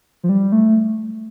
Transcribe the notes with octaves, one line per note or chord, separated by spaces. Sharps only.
F3
G3
A3